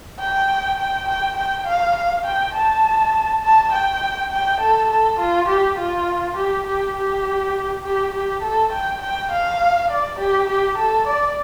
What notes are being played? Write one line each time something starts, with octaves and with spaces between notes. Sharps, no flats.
G5
G5
G5
G5
F5
F5
G5
A5
A5
G5
G5
A4
A4
F4
G4
F4
G4
G4
G4
G4
G4
A4
G5
G5
F5
D5
G4
G4
A4
D5